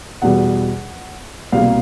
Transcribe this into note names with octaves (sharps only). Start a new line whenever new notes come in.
E2 B2 G3 F#5
C2 B2 G3 A#3 F5